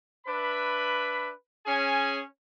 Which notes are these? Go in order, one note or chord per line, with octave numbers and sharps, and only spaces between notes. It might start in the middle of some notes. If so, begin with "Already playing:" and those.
D4 B4 E5 B5
C#4 G#4 G#5